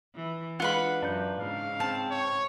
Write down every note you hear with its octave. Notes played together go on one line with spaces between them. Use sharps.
E3
G#3 D4 F4 B4 F#5 B5
F#2 D4 A#5 G6
G#2 C#3 F5
C4 A5
C#5